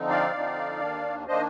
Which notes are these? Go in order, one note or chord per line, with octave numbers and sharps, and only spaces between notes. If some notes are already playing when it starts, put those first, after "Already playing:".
Already playing: D3 F3 C4 D#4
D5 F5
D3 F3 C4 D#4
D#2 D#3 A#3 D4
D#3 A#3 D4 C5 D#5